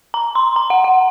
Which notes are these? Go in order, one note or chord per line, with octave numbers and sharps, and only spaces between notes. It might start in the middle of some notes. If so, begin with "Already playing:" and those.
A#5
C6
A#5
F#5
F#5